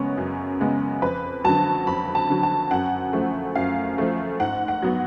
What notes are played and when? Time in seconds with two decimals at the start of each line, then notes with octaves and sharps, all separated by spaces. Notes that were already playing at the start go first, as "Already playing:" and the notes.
Already playing: F#2 C#3 G#3 B3 C#5
0.17 F#2
0.61 C#3 G#3 B3
1.02 F2 B4
1.44 D3 F#3 A5
1.87 F2 B5
2.15 A5
2.30 D3 F#3
2.43 A5
2.71 F#2 F#5
3.13 F3 A3
3.55 F#2 F5
3.98 F3 A3
4.40 G#2 F#5
4.68 F#5
4.82 F#3 B3